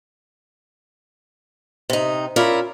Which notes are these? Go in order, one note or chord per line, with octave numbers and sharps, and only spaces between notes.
C3 D#4
C#4 E4 F4 A#4 D5